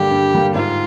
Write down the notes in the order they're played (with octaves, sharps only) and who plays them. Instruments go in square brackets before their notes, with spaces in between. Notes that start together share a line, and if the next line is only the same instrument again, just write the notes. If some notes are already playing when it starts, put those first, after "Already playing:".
Already playing: [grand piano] G2 D3 G3 A#3 [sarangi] G4
[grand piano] G2
D3 G3 A#3
[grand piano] G#2 [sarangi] F4